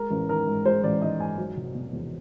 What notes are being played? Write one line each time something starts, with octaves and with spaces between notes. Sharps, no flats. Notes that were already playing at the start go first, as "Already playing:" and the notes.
Already playing: G#3 A#4
A1
D#3 A#4
G#2
G#3 C5
A1 D5
D#3 D#5
G#2 G#5
F#3
F1
B2
E2